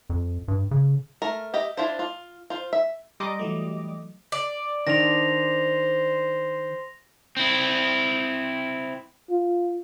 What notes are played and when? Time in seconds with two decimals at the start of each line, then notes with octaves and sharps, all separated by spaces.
0.10 F2
0.48 G2
0.71 C#3
1.22 A3 A#4
1.54 G4 D#5 E5
1.77 D4 E4 F4 C5
1.99 F4
2.50 F4 C5
2.73 E5
3.20 G3 D#5 A#5 C6 D6
3.39 E3 F#3 A3
4.32 D5
4.87 D#3 D4 C5 A#6 F7
7.37 C4 E4
9.30 F4